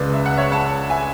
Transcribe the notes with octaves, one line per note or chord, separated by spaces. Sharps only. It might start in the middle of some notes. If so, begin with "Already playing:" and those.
Already playing: C#2 C#3 G#3 B4 D5
E5
F#5
C#5 E5
F#5 A5
E5 G#5